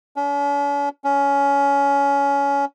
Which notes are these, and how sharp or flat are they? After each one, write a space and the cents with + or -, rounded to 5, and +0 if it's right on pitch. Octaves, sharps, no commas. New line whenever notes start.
C#4 +45
C#4 +20